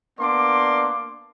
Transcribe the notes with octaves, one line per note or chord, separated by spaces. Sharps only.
A#3 B3 D4 D5 C6 D6